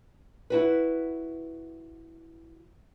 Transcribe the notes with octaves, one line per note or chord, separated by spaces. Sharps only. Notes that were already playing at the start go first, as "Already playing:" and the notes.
E4 F#4 B4